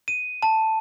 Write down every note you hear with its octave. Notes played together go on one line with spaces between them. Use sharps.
D#7
A5